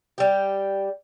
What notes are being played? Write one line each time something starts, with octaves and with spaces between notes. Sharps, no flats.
G3 G4